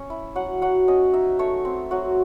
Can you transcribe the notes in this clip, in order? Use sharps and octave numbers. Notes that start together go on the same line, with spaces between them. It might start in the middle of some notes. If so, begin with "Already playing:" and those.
Already playing: C#4
E4
F#3 F#5
F#3 F#5
C#4 D#5
D#4 E5
A3 C#5
C4
F#3 F#4